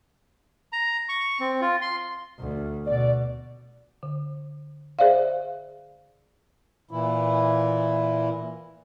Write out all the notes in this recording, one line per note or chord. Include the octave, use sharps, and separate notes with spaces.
A#5
C#6
C4
F4
C6
D2
B2 D5
D3
G#4 C5 D5 E5 F5
A#2 E3 E4